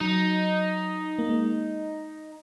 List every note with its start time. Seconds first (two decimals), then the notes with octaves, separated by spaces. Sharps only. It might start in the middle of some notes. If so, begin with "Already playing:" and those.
0.01 F#3 D#4
1.19 A#3
1.29 G#3